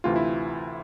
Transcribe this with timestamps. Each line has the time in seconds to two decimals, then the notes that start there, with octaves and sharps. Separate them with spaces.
0.04 D2 C3 E3 F4
0.16 E4